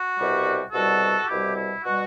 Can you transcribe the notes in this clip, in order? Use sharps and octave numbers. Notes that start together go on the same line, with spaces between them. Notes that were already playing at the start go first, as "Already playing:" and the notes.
Already playing: F#4
C2 B2 G3
C2 B2 G3 F#4 A4
C2 B2 G3 E4 G4
E4
B2 G3 F#4